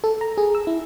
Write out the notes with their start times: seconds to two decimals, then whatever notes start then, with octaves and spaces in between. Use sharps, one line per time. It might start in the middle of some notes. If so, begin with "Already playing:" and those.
0.04 A4
0.21 A#5
0.38 G#4
0.55 E6
0.67 E4